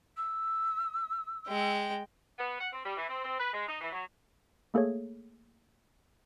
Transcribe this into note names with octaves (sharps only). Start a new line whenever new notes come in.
E6
G#3 G5
B3
F#5
C4
G3
E3
C4
C4
B4
G#3
D#4
E3
F#3
A3 A#3 G#4 A4 C#5